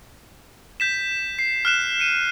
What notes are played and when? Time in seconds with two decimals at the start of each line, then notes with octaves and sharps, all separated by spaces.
0.80 G6 B6 E7
1.39 C7
1.65 F6 F#6 E7
2.00 C#7 D#7